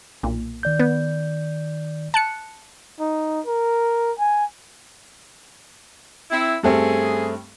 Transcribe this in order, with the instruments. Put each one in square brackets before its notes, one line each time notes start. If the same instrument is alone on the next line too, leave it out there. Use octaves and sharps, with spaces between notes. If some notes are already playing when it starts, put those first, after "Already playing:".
[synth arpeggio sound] B1 A#2
[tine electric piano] D#3 D5 G6
[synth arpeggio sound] B3
A5 F#6 C#7
[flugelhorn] D#4
A#4
G#5
[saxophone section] C4 E4
[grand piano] G2 A3 C4 [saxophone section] C#4 G#4